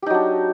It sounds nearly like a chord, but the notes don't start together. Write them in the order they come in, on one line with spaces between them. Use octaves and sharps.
G4 D#4 F#3 D4